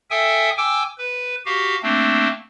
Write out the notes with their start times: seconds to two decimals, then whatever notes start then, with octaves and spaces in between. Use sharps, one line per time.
0.11 A4 E5 G5 G#5 D#6
0.57 G5 G#5 D6 E6
0.98 B4
1.46 F#4 G4 F5
1.83 A3 A#3 C4 D4